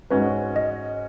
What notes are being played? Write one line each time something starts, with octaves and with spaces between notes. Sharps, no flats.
G#2 G#3 C#4 F#4 B4
D#5